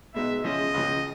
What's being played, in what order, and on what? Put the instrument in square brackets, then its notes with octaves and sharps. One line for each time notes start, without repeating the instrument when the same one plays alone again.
[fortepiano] B2 G#3 B3 D#4 [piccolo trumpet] E5
[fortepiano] C#3 F3 G#3 C#4 [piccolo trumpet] D#5
[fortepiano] C#2 C#3 F3